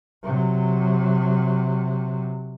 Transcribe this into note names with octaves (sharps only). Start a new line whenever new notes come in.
C3 F#3